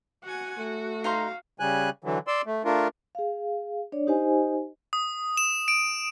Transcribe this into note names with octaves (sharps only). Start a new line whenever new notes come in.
F#4 F#5 G#5
A3 F#4
D#4 F5 A#5 C6
C#3 G3 G#5 F#6
D3 E3 F#3
D5 C6 E6
A3
A3 D4 F4 A#4
G#4 F5
D4 C#5 D5
D#4 G4 C5 D#5 G#5
D#6
E7
D7